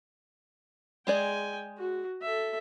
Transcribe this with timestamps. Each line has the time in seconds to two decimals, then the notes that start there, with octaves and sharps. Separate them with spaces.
1.07 G#3 G#4 D5 G5 G#5
1.78 F#4
2.22 A4 E5